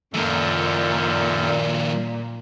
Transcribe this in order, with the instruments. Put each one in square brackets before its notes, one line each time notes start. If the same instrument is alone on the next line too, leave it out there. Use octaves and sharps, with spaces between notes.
[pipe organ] F#2 A4 [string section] A#2 [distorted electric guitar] D#3 F3